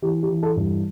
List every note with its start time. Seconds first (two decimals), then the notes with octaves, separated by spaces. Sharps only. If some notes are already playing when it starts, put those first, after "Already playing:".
0.02 E3 G4
0.23 G4
0.29 E3
0.43 A4
0.57 G2